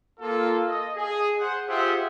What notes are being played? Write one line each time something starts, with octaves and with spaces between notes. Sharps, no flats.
A#3 F4 A4
D#5
G#4
C5 F#5
F4 G4 G#4 C5 E5 F#5